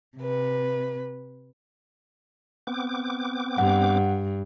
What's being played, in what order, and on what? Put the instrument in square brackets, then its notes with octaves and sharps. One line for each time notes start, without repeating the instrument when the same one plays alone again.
[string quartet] C3 B4
[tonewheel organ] B3 C4 D6
[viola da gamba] G2 [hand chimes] F#5